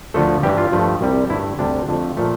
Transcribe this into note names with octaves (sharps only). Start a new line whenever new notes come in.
D2 D3 F3 A3 A4
G2 E3 G3 G4
F4
G2 F3 A3
C2 C3 G3
G2 D3 A3 E4
D2 C3 G3 D4
F2 D3 F3 A3
A#2 F3 A3